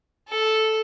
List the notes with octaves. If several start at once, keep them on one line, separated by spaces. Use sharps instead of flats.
A4